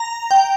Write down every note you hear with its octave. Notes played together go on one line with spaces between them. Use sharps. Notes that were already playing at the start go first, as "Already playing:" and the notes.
Already playing: A#5
G5